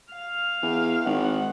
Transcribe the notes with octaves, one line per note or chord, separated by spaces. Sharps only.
F5
E2
G#1 F#5